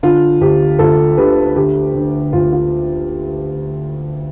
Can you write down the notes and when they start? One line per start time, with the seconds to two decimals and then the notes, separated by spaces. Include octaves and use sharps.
0.03 D3 F4
0.40 D2 G4
0.79 D2 F4 A4
1.17 D3 G4 B4
1.56 D3 G4
1.94 D3
2.33 D2 F4
2.53 F4